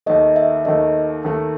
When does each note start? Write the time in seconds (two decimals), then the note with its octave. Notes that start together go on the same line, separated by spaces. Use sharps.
0.06 D#2 D#3 A3 D#5
0.36 E5
0.65 D#2 D#3 A3 D#5
1.24 D#2 D#3 A3